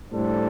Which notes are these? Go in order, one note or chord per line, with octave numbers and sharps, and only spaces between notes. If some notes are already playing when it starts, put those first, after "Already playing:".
A2 G3 D4 A4 C5